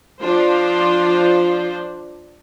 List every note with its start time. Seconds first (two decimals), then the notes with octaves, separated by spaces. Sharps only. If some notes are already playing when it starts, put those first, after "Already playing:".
0.22 F3 D4 F4 C5